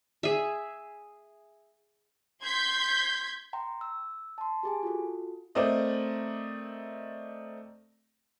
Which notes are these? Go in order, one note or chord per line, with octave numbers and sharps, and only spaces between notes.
G#4 E5
C6 G6 G#6 B6
G5 A#5 C6
E6
A5 C6
G4 G#4 G#5
F4 F#4 A4
A3 C4 A#4 D5 D#5